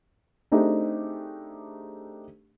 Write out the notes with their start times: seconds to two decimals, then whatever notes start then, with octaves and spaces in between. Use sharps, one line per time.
0.52 A3 C4 D4 D#4 G4 G#4